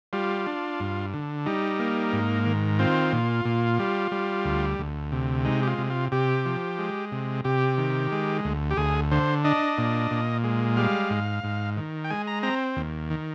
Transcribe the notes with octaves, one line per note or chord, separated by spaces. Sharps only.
G3 F4
D4
G2
D3
G3 D#4
A#3
G#2
D#3
C4 F4
A#2
A#2
G3
G3
D2
D2
C3
G#3 D#4
G4
F4
C3
F4
C3 G4
F3
G#3
C3
C3 G4
D#3
G#3
D2
G4
D2 G#4
D3 C5
D4 D#5
A#2
A#2
G#3
G3 F5
G#2
G#2
D#3
G5
G#3 G#5
A#5
C4 A#5
D#2
D#3